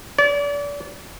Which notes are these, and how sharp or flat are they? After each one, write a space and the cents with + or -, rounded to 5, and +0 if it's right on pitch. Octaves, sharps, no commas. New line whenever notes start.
D5 -35